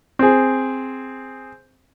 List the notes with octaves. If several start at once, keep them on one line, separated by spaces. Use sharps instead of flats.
C4 G#4